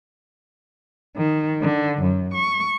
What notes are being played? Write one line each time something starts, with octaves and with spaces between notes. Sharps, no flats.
D#3
D3
F#2
C#6